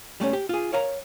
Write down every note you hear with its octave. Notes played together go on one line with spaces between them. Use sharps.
G3 A3 A#3 C#4
G4
F4 G#4
A#4 C#5 F5 A#5